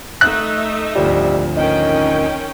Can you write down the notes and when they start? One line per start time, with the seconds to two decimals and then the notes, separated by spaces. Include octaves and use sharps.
0.21 A3 D#4 E5 F#6
0.95 G#1 D2 F3 G3
1.57 D#3 C#4 D#4 G5